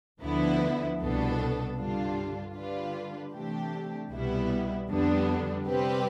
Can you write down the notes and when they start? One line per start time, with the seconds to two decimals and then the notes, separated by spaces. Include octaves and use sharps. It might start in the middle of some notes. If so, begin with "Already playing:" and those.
0.22 D2 D3 F3 B3 E4
1.00 C2 B2 B3 D4 A4
1.77 G2 D3 G3 D4 F4
2.55 D3 G3 D4 F4 B4
3.32 C3 E3 A3 D4 G4
4.10 C2 B2 G3 B3 E4
4.88 F2 D3 G3 B3 D4
5.66 C3 G3 C4 G4 B4